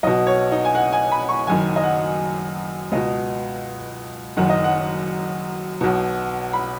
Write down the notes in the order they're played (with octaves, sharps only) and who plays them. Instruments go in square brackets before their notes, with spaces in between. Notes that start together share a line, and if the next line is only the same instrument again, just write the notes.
[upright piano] B1 B2 D#5
C#5
D#4
G#5
F#5
G#5
B5
C#6
F#1 F#2 D#3 G#5
D#5
F#5
C#2 B2 D#5
F#1 F#2 D#3 F#5
D#5
F#5
B1 B2
B5